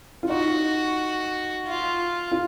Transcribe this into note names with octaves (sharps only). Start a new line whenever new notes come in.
F4
D#4 F#4
F4
F4